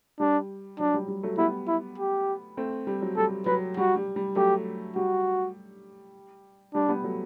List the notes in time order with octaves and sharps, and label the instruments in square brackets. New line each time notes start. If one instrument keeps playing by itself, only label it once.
[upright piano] G3 [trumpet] D4
[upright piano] F#3 [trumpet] D4
[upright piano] G3
G3
F#3 A3
[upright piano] G3 B3 [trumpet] E4
[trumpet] E4
G4
[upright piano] A3 C4
G3
F#3
[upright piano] G3 [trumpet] A4
[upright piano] F#3 [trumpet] B4
[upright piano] G3 [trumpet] F#4
[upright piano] G3
G3
[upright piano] F#3 A3 [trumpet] G4
[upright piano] G3 [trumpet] F#4
[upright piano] G3 [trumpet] D4
[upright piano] G3 B3
F#3 A3